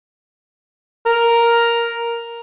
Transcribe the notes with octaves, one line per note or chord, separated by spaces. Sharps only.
A#4